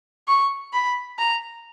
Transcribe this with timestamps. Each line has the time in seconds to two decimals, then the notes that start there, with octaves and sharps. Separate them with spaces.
0.28 C#6
0.73 B5
1.18 A#5